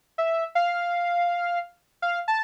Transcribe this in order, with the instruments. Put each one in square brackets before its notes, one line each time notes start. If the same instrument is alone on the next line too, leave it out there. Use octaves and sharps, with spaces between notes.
[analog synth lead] E5
F5
F5
A5